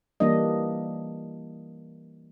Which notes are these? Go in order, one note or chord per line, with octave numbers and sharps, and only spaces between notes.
E3 G3 A#3 D4 D#5